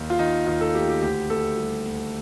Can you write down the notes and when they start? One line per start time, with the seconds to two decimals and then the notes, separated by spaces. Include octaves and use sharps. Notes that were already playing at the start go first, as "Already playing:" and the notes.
Already playing: D#2
0.10 F4
0.19 D#3 D#4
0.47 D#2 F4
0.61 A4
0.75 A3 G4
0.89 G4
1.02 D2 G4
1.30 D2 A4
1.57 G3
1.85 D2